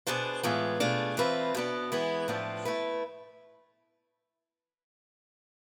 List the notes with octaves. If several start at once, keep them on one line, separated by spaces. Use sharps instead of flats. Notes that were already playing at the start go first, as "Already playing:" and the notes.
B2 B3 D4 G#4 C5
A2 E3 G#3 B3 F4
B2 A3 D4 F4 G#4
E3 A3 C4 F4 B4
B2 B3 D4
E3 G#3 B3 E4
A2 F3 B3 D4 F4
A3 E4 B4